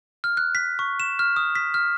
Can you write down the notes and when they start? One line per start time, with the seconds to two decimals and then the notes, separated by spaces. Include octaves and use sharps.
0.24 F6
0.37 F#6
0.55 B6
0.79 C#6
1.00 E7
1.19 F6
1.36 D#6
1.55 B6
1.74 F6